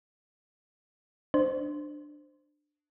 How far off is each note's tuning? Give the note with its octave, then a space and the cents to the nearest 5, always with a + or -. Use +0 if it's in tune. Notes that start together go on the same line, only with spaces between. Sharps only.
D4 +15 C5 -5